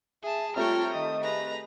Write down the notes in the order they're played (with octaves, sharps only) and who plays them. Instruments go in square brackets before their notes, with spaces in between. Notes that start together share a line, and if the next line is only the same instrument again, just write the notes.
[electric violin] G#4 A5 [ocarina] E5
[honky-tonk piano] G3 A3 C4 [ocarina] F4 [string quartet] C#5 G5 [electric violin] A#5 F6
[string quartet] D#3 [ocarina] D#5 [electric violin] D#6
[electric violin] G#4 B4 [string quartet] A#5